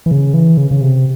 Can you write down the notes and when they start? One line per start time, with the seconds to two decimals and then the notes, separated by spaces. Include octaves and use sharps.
0.06 E3
0.11 C#3
0.34 E3
0.57 C#3
0.71 C#3
0.81 C3